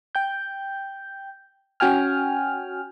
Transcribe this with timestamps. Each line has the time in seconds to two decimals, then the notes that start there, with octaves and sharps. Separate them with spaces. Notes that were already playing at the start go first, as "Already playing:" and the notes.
0.15 G5 G6
1.80 C#4 F#4 G5 G#5 F6